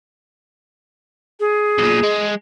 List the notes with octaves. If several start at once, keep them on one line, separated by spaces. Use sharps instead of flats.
G#4
B1 A#2
G#3